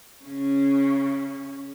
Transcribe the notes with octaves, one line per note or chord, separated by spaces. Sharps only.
C#3 C#4